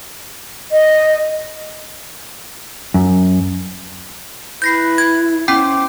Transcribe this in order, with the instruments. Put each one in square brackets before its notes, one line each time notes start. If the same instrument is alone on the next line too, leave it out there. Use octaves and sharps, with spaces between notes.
[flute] D#5
[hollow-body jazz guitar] F#2
[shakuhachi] E4 [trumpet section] B4 [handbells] G6 A#6 C7
[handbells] G#6
[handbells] B3 C#4 G5 [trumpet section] C5 D6